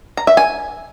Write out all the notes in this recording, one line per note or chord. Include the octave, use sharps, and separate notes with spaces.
A#5
E5
G#5